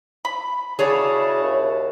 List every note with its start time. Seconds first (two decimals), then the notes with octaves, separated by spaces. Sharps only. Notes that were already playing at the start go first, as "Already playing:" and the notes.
0.25 B5
0.79 C#3 E4 F#4 G#4 C#5 D5 A5
1.43 D#2